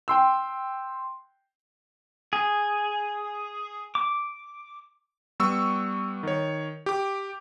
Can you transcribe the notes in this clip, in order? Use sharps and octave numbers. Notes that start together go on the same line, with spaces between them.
G5 C6 E6
G#4
D6
G3 B3 C#6 E6
D#3 C#5
G4 D6